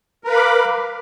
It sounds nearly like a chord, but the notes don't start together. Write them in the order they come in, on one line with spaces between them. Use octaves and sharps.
A#4 B4 F5 B5 D6